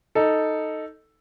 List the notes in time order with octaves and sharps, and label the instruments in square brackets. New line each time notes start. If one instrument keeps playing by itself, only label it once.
[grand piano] D#4 A4